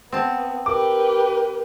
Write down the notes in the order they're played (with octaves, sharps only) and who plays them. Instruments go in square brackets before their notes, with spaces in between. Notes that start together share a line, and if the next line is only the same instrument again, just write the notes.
[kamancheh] B3 [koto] C4 A5
[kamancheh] G4 B4 [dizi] A#4 [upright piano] D6